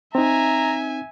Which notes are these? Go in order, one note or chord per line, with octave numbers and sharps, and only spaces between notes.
C4 D#4 E5 G#5 A#5